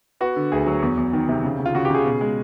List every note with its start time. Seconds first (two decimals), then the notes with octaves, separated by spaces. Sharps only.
0.21 B3 F#4
0.36 D3
0.52 D2 G#4
0.67 F#3
0.82 E2
0.97 E2
1.13 D#3
1.29 C3
1.44 C#3
1.59 C#3
1.66 F4
1.74 C#3 F#4
1.85 G4
1.90 C#3 G#4
2.05 B2
2.21 G#3